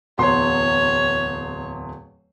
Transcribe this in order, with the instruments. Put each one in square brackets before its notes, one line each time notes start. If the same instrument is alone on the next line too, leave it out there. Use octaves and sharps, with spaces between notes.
[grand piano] D1 E2 C6 [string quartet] C#5